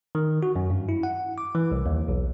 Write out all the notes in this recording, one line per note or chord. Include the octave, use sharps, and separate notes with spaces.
D#3
F#4
F#2
G2
E4
F#5
D6
E3
C2
D#2
B1